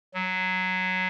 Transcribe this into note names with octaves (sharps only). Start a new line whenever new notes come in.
F#3